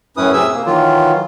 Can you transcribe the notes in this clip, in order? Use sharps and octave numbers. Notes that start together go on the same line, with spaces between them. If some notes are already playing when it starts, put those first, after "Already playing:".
F#2 A2 C#4 E4 B4 D#6
C3 G#4 E5 E6
A#3
D#3 E3 F#3 F4